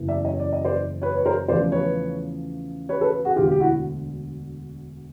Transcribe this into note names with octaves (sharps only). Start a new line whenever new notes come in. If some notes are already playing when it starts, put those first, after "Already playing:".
Already playing: F#1 E2 C#3 E3
D5 E5
C#5 D#5
D5
D#5
C5 D5
B4 C#5
C#5
A#4 C5
E2 C#3 F3 A3 C#4 C5 D5
B4 C#5
B4 C#5
A4 B4
F#4 G#4
E1 D2 D3 F4 G4
G4
E4 F#4